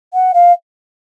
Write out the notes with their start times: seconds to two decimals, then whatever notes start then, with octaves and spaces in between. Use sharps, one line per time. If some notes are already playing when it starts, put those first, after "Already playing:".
0.14 F#5
0.34 F5